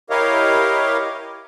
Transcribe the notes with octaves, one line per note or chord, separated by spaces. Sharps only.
E4 G4 A#4 C#5 D#5 F5